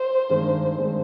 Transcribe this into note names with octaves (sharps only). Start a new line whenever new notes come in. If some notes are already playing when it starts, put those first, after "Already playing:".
Already playing: C5
G2 D#3 G#3 C4
G2 D#3 G#3 C4